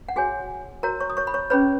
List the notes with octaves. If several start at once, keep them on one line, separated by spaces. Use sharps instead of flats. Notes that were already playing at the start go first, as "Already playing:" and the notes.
F#5
F#4 G#4 C#5 G#5
F#4 A#4 C#5 A#5
C#5 C#6
D#6
C#5 C#6
B5
C#5 C#6
C#4 G#4 B4 C#5 B5